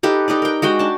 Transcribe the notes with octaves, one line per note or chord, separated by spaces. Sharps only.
D#4 G4 A4 B4
D#4 G4 B4 D5
A#4 G5
G#3 F#4 F#5 G5
D4 A5